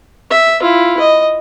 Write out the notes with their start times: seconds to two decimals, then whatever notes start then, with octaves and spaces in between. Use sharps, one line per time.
0.31 E5
0.62 E4 F4
1.00 D#5